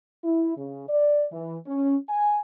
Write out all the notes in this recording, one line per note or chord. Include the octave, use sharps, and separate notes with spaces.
E4
C#3
D5
E3
C#4
G#5